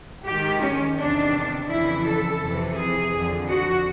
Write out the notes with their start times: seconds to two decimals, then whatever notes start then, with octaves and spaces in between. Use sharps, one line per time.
0.26 G#2 D#3 G4
0.62 C#4
0.98 E2 C3 D#3 D4
1.69 F2 C#3 E3 E4
2.05 A4
2.40 F2 C3 E3
2.76 G#4
3.12 F2 D3
3.48 F#4